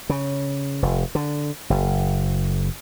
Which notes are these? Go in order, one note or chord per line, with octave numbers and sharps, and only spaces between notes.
C#3
F1
D3
F#1